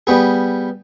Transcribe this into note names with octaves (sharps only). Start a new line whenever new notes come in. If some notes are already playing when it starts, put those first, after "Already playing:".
G3 B3 G#4